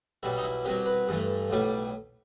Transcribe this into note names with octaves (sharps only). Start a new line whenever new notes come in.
B1 B2 G3 E4
D#4
E4
C2 B2 F#3 G4
B4
G2 E3 A3
B1 A2 G3